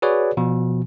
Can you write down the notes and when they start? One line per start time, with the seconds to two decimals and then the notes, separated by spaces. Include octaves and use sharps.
0.02 F#4 G#4 B4 C#5 D5
0.37 B2 F3